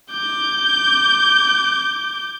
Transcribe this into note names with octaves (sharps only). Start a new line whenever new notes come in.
D6 G6